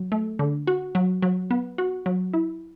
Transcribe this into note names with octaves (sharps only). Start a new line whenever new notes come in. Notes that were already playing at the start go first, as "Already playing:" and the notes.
Already playing: F#3
A3
D3
F#4
F#3
F#3
B3
F#4
F#3
E4